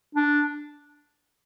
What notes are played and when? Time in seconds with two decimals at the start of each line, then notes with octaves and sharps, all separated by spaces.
0.15 D4